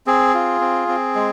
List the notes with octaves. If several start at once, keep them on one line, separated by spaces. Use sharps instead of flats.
C4 G#4
F4
C4
C4
G#3